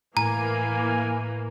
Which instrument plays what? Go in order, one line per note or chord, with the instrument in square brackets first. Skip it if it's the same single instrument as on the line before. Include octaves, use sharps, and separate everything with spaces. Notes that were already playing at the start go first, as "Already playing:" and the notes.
[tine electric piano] A2 [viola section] E3 A#3 [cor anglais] G#5 [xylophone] A#5